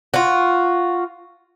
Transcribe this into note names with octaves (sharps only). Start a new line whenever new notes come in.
F4 F#4